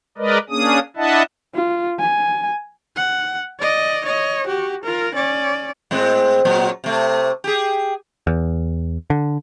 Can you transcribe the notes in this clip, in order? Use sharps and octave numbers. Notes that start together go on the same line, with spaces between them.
G#3 A#4 B4 D5 D#5
A#3 C#4 D4 G#4 D#6
D4 E4 D#5 E5 F#5 A5
F4
G#5
F#5
D5 D#5
C#5 D#5
F#4 G4
F4 A#4
C#4 D5
A2 G#3 C4
A#2 F#3
C3 A3
G4 G#4
E2
D3